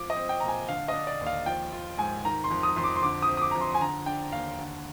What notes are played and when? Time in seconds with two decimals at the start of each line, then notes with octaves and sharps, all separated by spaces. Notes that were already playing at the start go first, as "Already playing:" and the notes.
Already playing: F3 D6
0.10 D#5
0.17 C4
0.29 G5
0.40 A#2 A#5
0.48 G#5
0.69 D3 F5
0.88 D#5
0.94 D4
1.07 D5
1.21 D#2
1.27 F5
1.46 F3 G5
1.72 F4
1.98 G#2 G#5
2.25 D#3 A#5
2.44 C6
2.50 F2
2.63 D#6
2.77 F2 C6
2.84 D6
2.96 C6
3.03 D3 D6
3.22 D#6
3.28 C4
3.37 D#6
3.42 D6
3.51 F2 A#5
3.61 C6
3.75 G#5
3.80 D3 A#5
4.06 D4 G5
4.32 D#2 F5
4.59 D3